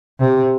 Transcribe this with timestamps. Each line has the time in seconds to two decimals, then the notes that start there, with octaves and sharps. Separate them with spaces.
0.19 C3